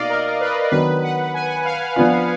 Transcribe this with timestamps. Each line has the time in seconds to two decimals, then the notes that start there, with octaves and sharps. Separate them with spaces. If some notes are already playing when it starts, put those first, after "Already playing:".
Already playing: B2 A#3 D#4 D5 D#5 F5
0.10 A#4
0.40 B4
0.71 D#3 F#3 B3 D4 B4
1.03 F#5
1.34 G#5
1.65 F5
1.96 F3 B3 D4 F4